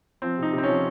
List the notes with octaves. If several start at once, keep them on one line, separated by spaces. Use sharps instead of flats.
F3 C4
C3 D#4
C3
C4
F3 C#4